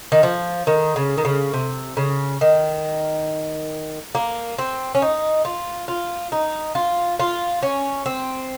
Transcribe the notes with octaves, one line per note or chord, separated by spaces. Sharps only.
D#3
F3
D#3
C#3
D#3
C#3
C3
C#3
D#3
A#3
C4
C#4
D#4
F4
F4
D#4
F4
F4
C#4
C4